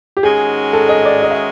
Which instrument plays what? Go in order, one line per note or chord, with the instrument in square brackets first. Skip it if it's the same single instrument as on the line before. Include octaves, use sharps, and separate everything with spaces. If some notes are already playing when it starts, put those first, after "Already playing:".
[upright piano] G4
[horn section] G#2 D#3 G#3 C#4 F#4 [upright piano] G#4
[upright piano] A4
D#5
D5
D#5
E5